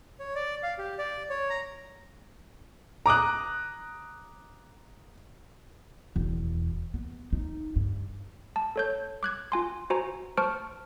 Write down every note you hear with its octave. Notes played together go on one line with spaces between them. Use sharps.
C#5
D5
F5
G4
D5
C#5
A#5
A#5 D6 D#6 F#6
E1
B3
D#4
G2
A5
A4 C#5 G6
D6 F#6 G#6
F4 G#5 C6
F#4 C5 G#5 A#5
C5 A5 C#6 F6 D7